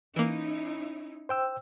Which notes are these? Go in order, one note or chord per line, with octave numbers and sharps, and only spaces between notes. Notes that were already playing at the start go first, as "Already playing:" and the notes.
E3 A#3 C#4 D#4 E4
C5 G5 E6